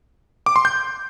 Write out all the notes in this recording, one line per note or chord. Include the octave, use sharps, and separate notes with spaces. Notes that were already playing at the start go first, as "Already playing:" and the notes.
D6
C6
G6